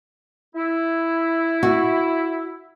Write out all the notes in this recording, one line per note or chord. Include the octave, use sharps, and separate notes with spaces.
E4
F#4